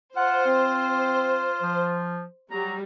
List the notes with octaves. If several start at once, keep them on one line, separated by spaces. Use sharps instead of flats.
F4 C5 F#5
C4
F3
F#3 G3 A#5